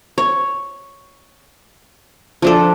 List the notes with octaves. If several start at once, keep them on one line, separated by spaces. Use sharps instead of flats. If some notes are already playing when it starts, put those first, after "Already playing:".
C#5
F3 D4 A4